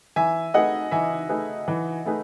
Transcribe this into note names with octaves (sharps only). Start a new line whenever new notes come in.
E3 E5 G#5
A3 D#4 G#4 B4 D#5 F#5
E3 E5 G#5
A3 D#4 G#4 B4
E3
A3 D#4 G#4 B4